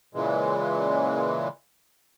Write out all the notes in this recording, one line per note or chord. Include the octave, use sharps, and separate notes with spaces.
A#2 C#3 E3 G#3